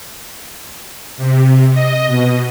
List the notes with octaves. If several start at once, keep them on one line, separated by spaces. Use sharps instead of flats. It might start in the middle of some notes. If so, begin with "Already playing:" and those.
C3
D#5
B2